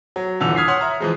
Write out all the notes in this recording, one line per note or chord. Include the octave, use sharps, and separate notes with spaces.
F#3
D#1 D3 E3 E6 F7
D#6 F6 G#6 B6 C7
C#5 F#5 C6 F6
E5 A#5
E3 F3 G#3